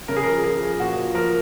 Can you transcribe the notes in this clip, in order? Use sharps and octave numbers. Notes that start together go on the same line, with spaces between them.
C#3 A#4
G#4
F3 A#4
F3 G#4
F3
A#2 F#4
F3
F3 A#4